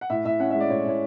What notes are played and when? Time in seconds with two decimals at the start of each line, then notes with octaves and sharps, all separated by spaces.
0.01 F#5
0.10 A2 E5
0.25 A2 E5
0.40 C#4 F#5
0.51 G#3 E5
0.60 D5
0.70 A2 C#5
0.85 A2 C#5